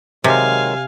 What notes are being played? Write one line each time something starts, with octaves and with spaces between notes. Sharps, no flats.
C3 D#3 F#3 G#3 F5 G#5